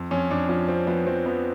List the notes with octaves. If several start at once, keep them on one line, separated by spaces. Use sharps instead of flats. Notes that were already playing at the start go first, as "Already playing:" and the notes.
Already playing: F2
F2 C#4
F2 D4
F3 C#4
F3 C4
F3 B3
F3 C4
F3 B3